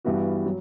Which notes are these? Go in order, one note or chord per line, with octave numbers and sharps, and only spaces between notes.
G2 E3 G3 B3 F#4
F#3